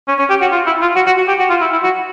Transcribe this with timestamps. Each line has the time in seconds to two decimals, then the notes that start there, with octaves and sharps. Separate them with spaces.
0.08 C#4
0.19 C#4
0.30 G4
0.41 F#4
0.52 F4
0.66 E4
0.81 F4
0.95 F#4
1.06 F#4
1.18 F#4
1.28 G4
1.39 F#4
1.50 F4
1.61 E4
1.72 E4
1.83 F#4